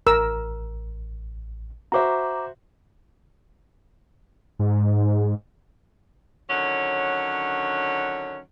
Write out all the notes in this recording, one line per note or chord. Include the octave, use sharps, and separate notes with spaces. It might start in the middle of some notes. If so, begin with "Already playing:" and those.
A1 A#4 E6
F#4 C5 E5 A#5 D6
G#2
D3 D#3 F#3 C#4